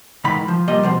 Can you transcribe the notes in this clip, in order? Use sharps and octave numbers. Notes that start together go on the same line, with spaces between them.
G#2 D#3 E3 B5
F3
C2 F2 A#2 G3 D#5
B2 F3 C4